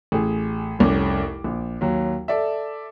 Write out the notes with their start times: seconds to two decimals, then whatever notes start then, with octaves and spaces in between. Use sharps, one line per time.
0.12 A1 G#4
0.79 F1 C2 C#4 D6
1.44 A#1
1.81 D#2 F#3
2.28 A4 D5 E5